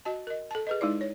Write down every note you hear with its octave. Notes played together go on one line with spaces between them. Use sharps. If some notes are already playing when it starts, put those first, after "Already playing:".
F#4 D#5 A5
A#4 D#5
A4 A5
G#4 B4 D#5
G#3 D#4 E4 D5
C#5